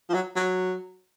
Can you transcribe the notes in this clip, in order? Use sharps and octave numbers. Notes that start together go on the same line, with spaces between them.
F3
F#3
F#3